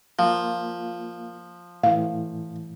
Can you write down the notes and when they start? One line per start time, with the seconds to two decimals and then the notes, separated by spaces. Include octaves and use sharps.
0.19 F3 A#3 F4
1.83 A2 E3 F5